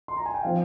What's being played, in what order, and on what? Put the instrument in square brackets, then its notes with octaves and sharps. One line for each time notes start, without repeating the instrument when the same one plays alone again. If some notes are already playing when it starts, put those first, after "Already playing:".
[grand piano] C6
A#5
G#5
G5
F3 C4 F5